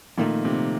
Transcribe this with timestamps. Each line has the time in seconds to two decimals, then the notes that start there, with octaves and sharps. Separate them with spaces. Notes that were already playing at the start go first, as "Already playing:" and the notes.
0.18 F2 A#2 D#3 A3 D#4
0.45 C3